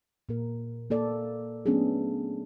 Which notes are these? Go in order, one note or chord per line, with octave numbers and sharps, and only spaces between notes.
A#2 A#3 A#4
A#3 A4 D5
F#3 A3 B3 C#4 D4 G#4